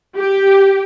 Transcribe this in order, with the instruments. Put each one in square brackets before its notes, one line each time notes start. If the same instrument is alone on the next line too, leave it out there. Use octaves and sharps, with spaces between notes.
[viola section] G4